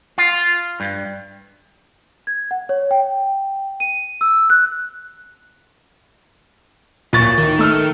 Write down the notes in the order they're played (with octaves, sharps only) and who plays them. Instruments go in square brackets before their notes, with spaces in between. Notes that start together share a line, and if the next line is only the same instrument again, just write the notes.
[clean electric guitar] F4
G2
[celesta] G#6
F#5
C#5
G5
D#7
E6
F#6
[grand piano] D1 C#6 A6 [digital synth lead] A#2
[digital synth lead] D#3
[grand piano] A3 E6 F6